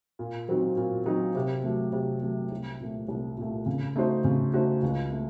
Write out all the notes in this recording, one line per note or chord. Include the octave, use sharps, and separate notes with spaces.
A#2
F#3 C4 D#4 F#4
A#2
F#3 C4 D#4 F#4
C3
F#3 A3
C3
F#3 A3
C2
A#2 A3
C2
A#2 A3
C#3
A3 D#4 F#4 C5
C#3
A3 D#4 F#4 C5
C#2
A3